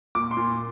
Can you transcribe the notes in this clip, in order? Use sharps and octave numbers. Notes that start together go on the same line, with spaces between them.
A#2 D6
C6
A#2